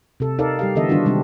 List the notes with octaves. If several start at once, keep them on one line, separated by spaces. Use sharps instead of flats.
C3 A4
D#4 A4 A#4 D5 F5
G3 G4 F5
D3 E3 B3 A4 D#5 E5
D#3 G3 D4 F4 F#4
C3 G3 G#3 C4 D4